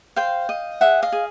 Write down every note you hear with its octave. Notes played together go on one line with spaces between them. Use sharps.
C5 F5 G5
D#5
G#4 E5 F#5
D#5 F5
G#4